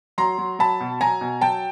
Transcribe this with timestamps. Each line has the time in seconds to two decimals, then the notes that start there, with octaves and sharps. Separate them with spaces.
0.18 F#3 A#5 C6
0.38 F#3
0.59 F#3 A5 B5
0.81 B2
1.01 F#3 G#5 A#5
1.21 B2
1.41 F#3 G5 A5